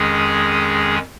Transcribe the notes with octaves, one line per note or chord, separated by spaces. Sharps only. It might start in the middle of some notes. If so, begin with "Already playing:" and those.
Already playing: F2 D#3 G#3 C#4 G#4